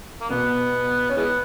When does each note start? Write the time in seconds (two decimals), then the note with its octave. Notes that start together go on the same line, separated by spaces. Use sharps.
0.21 A#3
0.30 B2 B3
1.10 C#4
1.16 E3 G#3 B3